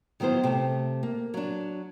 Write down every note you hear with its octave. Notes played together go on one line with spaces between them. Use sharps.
D#3 F#3 B3 E4 C5
C3 A3
A#3
F#3 D4